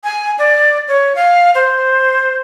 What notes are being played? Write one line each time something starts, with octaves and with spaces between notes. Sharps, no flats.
G#5
D5
C#5
F5
C5